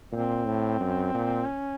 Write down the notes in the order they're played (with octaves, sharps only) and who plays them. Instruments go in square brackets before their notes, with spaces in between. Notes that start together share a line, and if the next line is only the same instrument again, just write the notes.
[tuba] A#2 [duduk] C4
[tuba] A2
F#2
A#2
[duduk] C#4